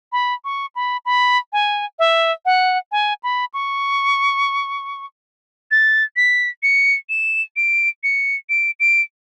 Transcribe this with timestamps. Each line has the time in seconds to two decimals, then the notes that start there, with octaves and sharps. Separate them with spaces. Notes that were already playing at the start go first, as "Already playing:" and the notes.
0.12 B5
0.44 C#6
0.75 B5
1.05 B5
1.53 G#5
1.99 E5
2.45 F#5
2.92 G#5
3.23 B5
3.54 C#6
5.71 A6
6.16 B6
6.63 C#7
7.09 E7
7.56 D7
8.03 C#7
8.49 D7
8.80 D7